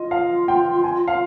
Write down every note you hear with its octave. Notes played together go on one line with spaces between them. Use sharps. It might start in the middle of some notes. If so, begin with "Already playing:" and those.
Already playing: F4 D#5
F5
G5
G#5
F5